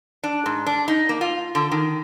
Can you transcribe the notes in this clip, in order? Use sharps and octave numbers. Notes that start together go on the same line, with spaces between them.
D4
G#2
D4
D#4
A#3
F4
D3
D#3